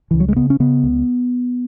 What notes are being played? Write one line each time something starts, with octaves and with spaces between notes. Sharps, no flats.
C#2 E3
F#3
G#3
C#3 B3
C#4
C#3 B3
C#2